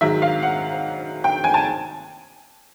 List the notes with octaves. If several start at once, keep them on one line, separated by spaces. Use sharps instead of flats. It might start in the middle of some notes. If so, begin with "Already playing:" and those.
G#2 D#3 F#3 E5
F5
F#5
G5
G#5
A5